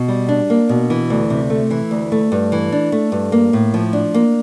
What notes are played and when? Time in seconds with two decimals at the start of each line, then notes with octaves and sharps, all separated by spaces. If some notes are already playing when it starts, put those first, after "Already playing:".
Already playing: B2
0.08 G3
0.29 D4
0.50 A#3
0.69 B2
0.90 E3
1.10 D2
1.30 C3
1.50 A3
1.71 E3
1.91 D2
2.12 A3
2.32 G2
2.52 E3
2.72 D4
2.92 A3
3.12 G2
3.32 A#3
3.53 A2
3.74 F3
3.93 D4
4.14 A#3